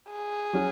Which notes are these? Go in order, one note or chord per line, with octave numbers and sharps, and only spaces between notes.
G#4
F#3 C#4 F#4